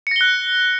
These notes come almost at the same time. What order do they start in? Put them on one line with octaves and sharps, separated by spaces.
C#7 A#6 G7 F#6